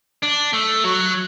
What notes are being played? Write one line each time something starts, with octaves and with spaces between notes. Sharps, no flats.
D4
A3
F#3